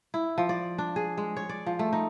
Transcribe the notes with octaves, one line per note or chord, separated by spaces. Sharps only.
E4
F3
D5
D4
G#4
G#3
C#5
D5
F3
A3
D#4